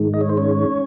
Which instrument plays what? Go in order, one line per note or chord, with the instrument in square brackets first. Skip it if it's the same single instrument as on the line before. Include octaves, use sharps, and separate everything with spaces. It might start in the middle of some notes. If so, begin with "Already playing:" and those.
Already playing: [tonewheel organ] G#2 D#3 G#3
D#5
C#5
C5
C#4 C#5